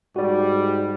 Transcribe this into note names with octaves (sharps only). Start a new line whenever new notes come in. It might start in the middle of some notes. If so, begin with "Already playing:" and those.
G#2 G3 F#4 D5